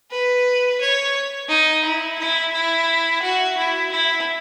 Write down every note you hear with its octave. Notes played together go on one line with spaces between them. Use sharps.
B4
C#5
D#4
E4
E4
E4
F#4
E4
E4